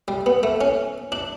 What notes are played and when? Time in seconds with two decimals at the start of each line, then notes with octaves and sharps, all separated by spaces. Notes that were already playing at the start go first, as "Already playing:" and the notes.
0.08 G3
0.26 B3
0.43 A3
0.61 C#4
1.12 D4